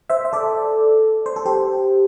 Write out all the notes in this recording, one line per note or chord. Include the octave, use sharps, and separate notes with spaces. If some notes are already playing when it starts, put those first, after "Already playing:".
C5 E5
E5
A4 D5
C5
A4
G4 C5